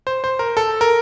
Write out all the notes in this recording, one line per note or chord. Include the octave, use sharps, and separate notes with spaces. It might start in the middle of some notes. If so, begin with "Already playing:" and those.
C5
C5
A#4
A4
A#4